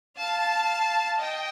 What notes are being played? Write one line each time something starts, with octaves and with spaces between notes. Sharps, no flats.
F5 A5
D#5 G5